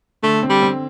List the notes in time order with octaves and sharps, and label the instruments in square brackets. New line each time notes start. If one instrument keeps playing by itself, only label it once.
[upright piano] D3 [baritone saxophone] A3
[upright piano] C4
[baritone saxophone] G3
[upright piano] C4